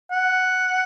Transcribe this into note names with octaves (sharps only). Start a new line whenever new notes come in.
F#5